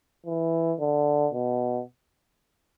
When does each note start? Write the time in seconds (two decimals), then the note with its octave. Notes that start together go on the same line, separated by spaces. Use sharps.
0.26 E3
0.80 D3
1.33 B2